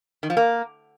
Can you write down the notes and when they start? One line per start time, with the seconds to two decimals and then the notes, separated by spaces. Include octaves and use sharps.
0.23 D#3
0.30 F3
0.37 A#3